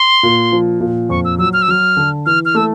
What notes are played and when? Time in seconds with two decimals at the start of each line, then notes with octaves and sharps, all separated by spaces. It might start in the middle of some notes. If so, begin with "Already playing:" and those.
Already playing: C6
0.23 A#2
0.52 F3
0.81 A#2
1.09 F2 C#6
1.25 E6
1.38 F#3 E6
1.53 F6
1.62 E6
1.68 F#3 F6
1.97 D3
2.26 E3 F6
2.45 F6
2.55 A3 E6